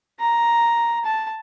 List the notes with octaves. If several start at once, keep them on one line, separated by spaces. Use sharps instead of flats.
A#5
A5